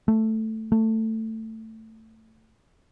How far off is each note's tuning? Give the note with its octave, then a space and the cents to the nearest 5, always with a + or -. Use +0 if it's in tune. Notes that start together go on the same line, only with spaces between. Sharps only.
A3 +5
A3 +15